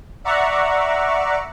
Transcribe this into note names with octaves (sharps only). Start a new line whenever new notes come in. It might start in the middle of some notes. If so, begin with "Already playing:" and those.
D5 E5 F#5 A#5 C#6